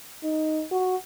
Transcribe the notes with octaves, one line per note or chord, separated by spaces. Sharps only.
D#4
F#4